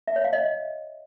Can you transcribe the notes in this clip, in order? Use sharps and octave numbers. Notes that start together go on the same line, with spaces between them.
E5
C#5
F5
D#5